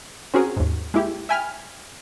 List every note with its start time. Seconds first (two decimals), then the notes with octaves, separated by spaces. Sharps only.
0.34 C4 C#4 F#4 G#4 A#4
0.57 D#2 G#2
0.94 G#3 A#3 E4 G4
1.29 E5 G5 G#5 B5 F6